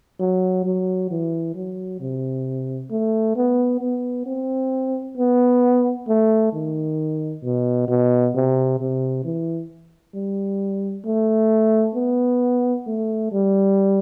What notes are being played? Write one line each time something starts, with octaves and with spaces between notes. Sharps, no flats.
F#3
F#3
E3
F#3
C3
A3
B3
B3
C4
B3
A3
D#3
B2
B2
C3
C3
E3
G3
A3
B3
A3
G3